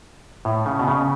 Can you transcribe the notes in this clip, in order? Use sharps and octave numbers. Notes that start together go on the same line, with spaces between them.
A2
C#3
B2
C#3